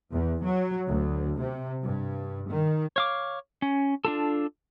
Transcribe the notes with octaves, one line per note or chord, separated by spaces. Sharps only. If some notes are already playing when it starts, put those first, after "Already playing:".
E2
F#3
D2
C3
G2
D#3
C#5 F5 D6
C#4
D4 F4 A4